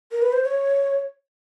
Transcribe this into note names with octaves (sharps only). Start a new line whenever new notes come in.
A#4
B4
C5
C#5